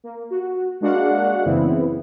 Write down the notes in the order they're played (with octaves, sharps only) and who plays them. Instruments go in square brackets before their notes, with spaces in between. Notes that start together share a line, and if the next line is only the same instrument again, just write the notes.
[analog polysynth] A#3
F#4
G#3 A#3 D4 F#4 F5 F#5
F#2 C#3 E3 B3 C4 E4